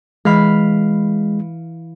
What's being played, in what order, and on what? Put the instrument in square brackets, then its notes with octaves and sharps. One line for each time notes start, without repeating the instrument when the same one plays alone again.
[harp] E3 F5 B5 [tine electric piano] G#3